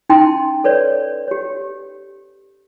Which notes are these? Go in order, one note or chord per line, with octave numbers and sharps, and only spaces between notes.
C#4 D#4 E4 G5 A5 C6
A4 B4 C#5 D5
G4 C#5